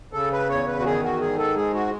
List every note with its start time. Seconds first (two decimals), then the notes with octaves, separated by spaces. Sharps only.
0.13 C#3 A4
0.32 B4
0.49 E2 C#5
0.67 B4
0.79 F#4
0.85 D#3 G#4
1.02 F#4
1.20 G#2 G#4
1.38 A4
1.56 G#3 G#4
1.74 F#4